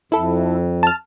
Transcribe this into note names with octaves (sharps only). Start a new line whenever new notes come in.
F2 E4 A4
A5 F6